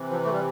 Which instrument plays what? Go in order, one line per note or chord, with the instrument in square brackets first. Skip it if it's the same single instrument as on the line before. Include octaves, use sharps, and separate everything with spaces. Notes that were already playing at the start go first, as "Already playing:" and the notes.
Already playing: [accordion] C3 E3
F3
A3
G3